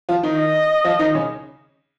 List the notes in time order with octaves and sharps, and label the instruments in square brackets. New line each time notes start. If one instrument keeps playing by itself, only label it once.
[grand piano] F3 F4
D#3 D#4
[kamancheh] D#5
[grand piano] F3 F4
D#3 D#4
C#3 C#4